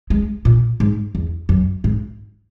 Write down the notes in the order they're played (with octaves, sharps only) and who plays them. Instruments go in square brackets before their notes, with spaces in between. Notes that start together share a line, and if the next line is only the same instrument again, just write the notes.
[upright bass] G#3
A#2
G#2
E2
F#2
G#2